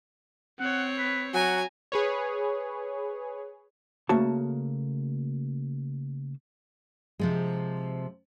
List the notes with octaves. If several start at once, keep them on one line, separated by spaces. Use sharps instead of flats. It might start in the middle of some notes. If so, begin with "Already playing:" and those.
C4 C#5 F#5
B4
F#3 F#4 G#5 A#5
G#4 B4 C#5
C#3 A3 A#3 F#4 A5
C3 F3 G#3